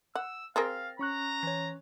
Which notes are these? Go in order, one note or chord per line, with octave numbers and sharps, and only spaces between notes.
F#5 E6
C4 G#4 A#4 F5 A6 A#6
C#4 A#5 C#6 F#6
E3 C#5